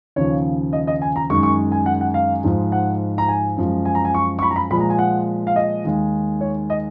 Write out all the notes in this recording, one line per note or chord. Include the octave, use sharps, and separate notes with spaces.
D#2 C#3 F3 C#5
D#5
D#5
G#5
A#5
F#2 D#3 G#3 C#6
C#6
G#5
F#5
F#5
F5
G#2 F3 G#3
F#5
A#5
G#5
F#2 F3 G#3
G#5
A#5
G#5
C#6
C#6
B5
A#5
B5
A#2 F3 G#3 B5
A#5
G#5
F#5
F5
D#5
D#2 D#3 G#3
C#5
D#5